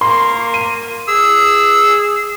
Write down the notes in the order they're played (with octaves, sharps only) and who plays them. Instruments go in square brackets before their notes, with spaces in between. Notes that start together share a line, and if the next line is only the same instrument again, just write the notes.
[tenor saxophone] A#3 [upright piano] C6
[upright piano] D#7
[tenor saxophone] G#4 [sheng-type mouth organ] E6